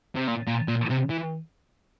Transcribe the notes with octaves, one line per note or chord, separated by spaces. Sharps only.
C3
A#2
A#2
A#2
C3
E3